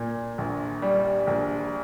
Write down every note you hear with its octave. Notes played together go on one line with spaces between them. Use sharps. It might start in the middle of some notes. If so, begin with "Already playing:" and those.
Already playing: A#2
A#1
G3
A#1